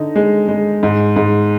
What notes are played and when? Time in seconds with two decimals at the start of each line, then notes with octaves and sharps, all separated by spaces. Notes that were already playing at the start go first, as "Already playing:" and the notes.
Already playing: D3 D#4
0.16 G#3
0.48 G#3
0.83 G#2
1.16 G#2